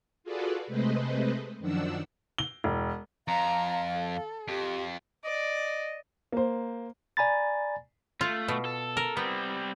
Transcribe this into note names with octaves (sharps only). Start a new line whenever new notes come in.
F4 F#4 G#4 A4 B4 D5
C3 G#3 A3 B4 C5 D#5
F#2 D#3 F3 D4 F#5 E6
G7
E1
F2 F5 A#5
A4
F2 G4
D5 D#5
A#3 C5
D5 G#5 A#5 B5 A6
A3 F4
B2
A4
A#4
G3 B3 C4